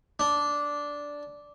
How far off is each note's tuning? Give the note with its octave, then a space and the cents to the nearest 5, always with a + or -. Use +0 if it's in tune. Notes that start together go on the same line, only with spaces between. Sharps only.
D4 -10